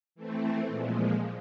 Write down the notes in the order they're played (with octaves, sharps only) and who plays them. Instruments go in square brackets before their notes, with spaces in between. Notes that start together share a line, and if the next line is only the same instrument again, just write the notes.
[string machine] E3 A3 C4
A#2 F3 G#3